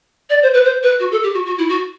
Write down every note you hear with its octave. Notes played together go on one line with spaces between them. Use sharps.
D5
C5
B4
C5
B4
F#4
A4
G4
F#4
F#4
E4
F#4